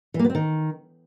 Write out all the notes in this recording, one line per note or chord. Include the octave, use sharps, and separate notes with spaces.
E3
A#3
B3
C4
D#3